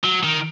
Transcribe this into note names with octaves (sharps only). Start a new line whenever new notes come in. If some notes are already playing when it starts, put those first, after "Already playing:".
F#3
D#3